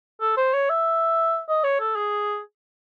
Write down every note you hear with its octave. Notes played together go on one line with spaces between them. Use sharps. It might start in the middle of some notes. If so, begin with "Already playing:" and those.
A4
C5
C#5
E5
D#5
C#5
A4
G#4